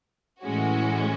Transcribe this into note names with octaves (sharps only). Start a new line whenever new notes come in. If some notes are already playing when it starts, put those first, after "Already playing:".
A2 E3 G#3 C#4 F#4